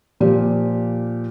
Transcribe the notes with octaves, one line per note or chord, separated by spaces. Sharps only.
A#2 F3 G4